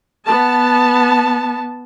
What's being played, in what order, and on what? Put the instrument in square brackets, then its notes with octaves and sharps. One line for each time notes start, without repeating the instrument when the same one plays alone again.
[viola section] B3 A5